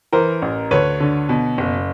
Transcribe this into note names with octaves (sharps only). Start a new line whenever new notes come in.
E3 A#4 C5
A1
D2 B4 C#5
D3
B2
F#1